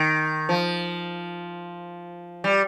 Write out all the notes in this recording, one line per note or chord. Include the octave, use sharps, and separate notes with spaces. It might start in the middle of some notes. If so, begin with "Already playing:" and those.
Already playing: D#3
F3
G3